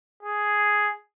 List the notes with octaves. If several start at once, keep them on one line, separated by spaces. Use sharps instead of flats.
G#4